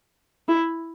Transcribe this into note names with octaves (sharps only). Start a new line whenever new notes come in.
E4